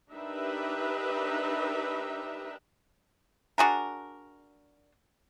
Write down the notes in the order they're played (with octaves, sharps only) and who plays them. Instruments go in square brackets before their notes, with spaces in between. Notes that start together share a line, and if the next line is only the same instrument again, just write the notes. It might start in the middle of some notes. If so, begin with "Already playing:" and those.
[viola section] D4 D#4 G4 A#4 B4 E5
[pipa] D4 F#4 G#4 A#4